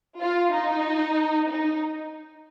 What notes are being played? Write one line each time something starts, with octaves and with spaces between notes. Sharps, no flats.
F4
D#4
D#4